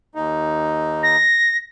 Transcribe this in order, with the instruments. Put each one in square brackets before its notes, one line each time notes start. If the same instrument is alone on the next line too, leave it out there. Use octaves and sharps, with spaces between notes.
[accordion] D#2 D#4
[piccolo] A#6